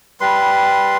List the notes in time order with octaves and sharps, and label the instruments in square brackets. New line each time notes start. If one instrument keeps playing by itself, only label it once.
[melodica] G3 B4 C6